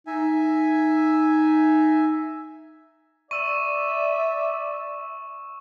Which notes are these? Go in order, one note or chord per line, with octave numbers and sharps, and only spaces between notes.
D#4 E5 G#5
D5 E5 C#6 E6 D#7 E7